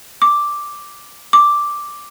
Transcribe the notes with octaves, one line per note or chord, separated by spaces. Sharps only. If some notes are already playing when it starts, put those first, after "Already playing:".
D6
D6